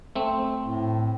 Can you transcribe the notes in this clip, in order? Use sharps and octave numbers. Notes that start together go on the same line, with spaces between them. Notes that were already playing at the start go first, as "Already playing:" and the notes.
A3 C4
A2